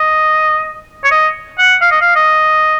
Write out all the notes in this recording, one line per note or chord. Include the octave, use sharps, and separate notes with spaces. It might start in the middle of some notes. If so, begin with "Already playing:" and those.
Already playing: D#5
C#5
D#5
F#5
F5
D#5
F5
D#5